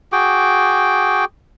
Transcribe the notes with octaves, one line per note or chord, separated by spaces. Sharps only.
F#4 G#4 G5 D6